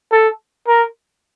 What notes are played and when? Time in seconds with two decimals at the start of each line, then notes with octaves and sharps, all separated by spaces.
0.12 A4
0.67 A#4